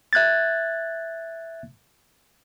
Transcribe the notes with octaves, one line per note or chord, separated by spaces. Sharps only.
E5 F#6 G#6 A6